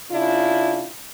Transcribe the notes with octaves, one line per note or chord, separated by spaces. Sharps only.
C#3 D4 E4 F4